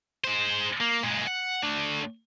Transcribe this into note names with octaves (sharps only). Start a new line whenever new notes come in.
G#3 C5
A#3
A#2 G#3
F#5
A3 D4